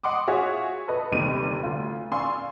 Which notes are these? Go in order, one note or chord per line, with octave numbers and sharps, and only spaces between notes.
D#5 F#5 C6 D6 D#6
F4 F#4 G#4 C#5 E5
A4 B4 D#5
G1 D#2 C3 G3 D#7
D2 F4
D5 F5 G#5 C6 C#6 E6